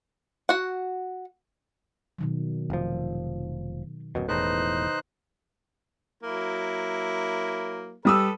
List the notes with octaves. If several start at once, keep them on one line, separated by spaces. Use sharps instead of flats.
F#4 F#5
B2 D#3 F#3
F1 F3
D1 F#2 B2
E1 E2 A2 D#4 B4 C5 F#6
F#3 A#3 E4
G3 A4 B4 D#6 E6